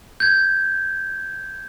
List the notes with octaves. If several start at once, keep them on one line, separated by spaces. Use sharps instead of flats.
G6 G#6